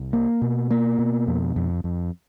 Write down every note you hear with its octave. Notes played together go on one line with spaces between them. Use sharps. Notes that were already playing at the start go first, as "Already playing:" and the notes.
Already playing: C2
A#3
B2
A#3
B2
F2
F2
F2